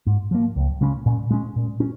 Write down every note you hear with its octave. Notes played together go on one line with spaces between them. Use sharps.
G#2
F3 A#3
C#2
C#3 G#3 C#4
A#2
G#3 C#4
A#2
C#4